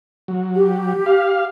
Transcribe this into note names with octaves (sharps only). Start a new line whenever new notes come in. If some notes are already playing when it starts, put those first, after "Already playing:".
F#3
G4
F5